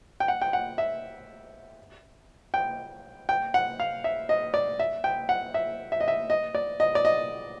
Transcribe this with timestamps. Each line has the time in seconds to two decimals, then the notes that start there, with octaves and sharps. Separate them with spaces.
0.20 G5
0.28 F#5
0.42 G5
0.53 F#5
0.78 E5
2.54 G5
3.29 G5
3.54 F#5
3.80 F5
4.04 E5
4.29 D#5
4.54 D5
4.79 E5
5.04 G5
5.29 F#5
5.54 E5
5.92 E5
6.00 D#5
6.08 E5
6.30 D#5
6.55 D5
6.80 D#5
6.95 D5
7.05 D#5